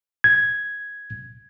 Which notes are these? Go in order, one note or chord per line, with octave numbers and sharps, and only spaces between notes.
G#6